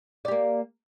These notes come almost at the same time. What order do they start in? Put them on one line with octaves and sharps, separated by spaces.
D5 G4 A#3